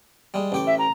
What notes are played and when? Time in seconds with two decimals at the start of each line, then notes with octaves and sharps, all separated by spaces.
0.34 G3 G#3
0.52 A1 G4 D6
0.67 E5
0.79 A#5